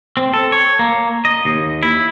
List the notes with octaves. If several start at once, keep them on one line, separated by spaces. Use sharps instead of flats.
C4
A4
C#5
A#3
D#5
D#2
E4